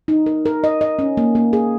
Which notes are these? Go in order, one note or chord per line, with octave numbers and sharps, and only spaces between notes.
D#4
A#4
A#4
D#5
D#5
C#4
A#3
A#3
G#4